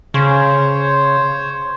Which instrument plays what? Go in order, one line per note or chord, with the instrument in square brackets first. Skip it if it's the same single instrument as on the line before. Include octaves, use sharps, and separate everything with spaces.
[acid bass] C#3 [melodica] C5 C#5